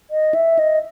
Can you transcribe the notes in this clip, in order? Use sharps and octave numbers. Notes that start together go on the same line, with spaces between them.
D#5
E5
D#5